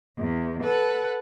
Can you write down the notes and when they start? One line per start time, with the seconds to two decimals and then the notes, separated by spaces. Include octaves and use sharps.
0.19 E2
0.63 A4 B4 F#5